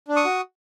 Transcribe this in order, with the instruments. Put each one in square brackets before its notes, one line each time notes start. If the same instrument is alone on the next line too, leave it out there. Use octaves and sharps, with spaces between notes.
[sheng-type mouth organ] D4
C#6 D#6
F#4